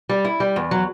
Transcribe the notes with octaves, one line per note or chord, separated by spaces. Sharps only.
G3
E4
G3
E2
F#3